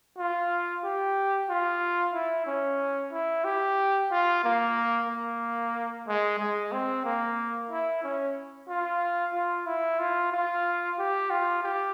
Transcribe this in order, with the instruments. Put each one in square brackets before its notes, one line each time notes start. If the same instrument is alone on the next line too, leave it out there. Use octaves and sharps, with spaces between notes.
[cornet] F4
G4
F4
E4
C#4
E4
G4
F4
A#3
A#3
G#3
G#3
C4
A#3
E4
C#4
F4
F4
E4
F4
F4
G4
F4
G4